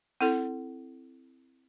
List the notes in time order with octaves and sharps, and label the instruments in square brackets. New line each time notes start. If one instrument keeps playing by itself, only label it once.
[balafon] C4 E4 A4